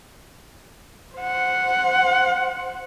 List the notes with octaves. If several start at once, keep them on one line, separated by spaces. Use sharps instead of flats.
C5 F#5